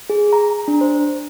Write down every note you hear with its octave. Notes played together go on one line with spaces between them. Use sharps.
G#4
A#5
D4
C5